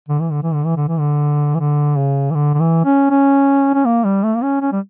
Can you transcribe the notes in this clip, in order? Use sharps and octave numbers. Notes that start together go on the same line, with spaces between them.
D3
E3
D3
E3
D3
E3
D3
E3
D3
E3
D3
C#3
E3
D3
D3
E3
C#4
C#4
C#4
A#3
G3
A3
A#3
C#4
C#4
G3